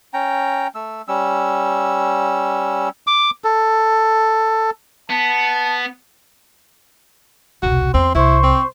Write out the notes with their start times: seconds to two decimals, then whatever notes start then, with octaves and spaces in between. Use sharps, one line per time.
0.14 C#4 G5 A#5
0.75 A3 E6
1.08 G3 C#4 E6
3.07 D6
3.44 A4
5.10 B3 A5
7.63 E1 C2 F#4
7.94 E2 C4 C6
8.15 C2 E4 C5 C#6
8.43 C4